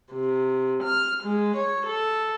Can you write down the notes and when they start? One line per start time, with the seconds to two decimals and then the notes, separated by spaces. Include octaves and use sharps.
0.13 C3
0.84 F6
1.24 G#3
1.58 C#5
1.88 A4